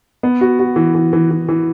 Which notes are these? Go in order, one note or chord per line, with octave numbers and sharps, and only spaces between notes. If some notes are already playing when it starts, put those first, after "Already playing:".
B3
F#4
F#4
E3
E3
E3
E3
E3